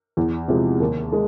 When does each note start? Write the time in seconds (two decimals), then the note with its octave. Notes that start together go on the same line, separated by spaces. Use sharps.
0.17 E2
0.48 C3 F3 G#3
0.80 D#2
1.12 G#3